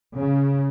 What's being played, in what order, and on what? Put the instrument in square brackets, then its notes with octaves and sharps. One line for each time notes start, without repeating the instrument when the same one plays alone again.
[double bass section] C#3